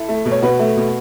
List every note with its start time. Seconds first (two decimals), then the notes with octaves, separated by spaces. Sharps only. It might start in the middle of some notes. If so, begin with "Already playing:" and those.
Already playing: E4 A4
0.09 A3
0.26 B2
0.32 C#5
0.42 B2 F#4 B4
0.59 A3
0.77 B2